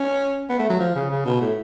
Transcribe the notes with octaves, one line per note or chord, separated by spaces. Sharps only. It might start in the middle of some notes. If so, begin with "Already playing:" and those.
Already playing: C#4
B3
A3
F#3
F3
C#3
C#3
B2
A2